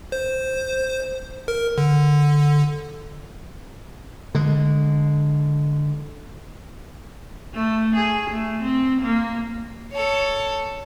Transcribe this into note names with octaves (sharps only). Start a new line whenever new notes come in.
C5
A#4
D3
D3 G#3
A3
G#4
A3
C4
A#3
A4 C#5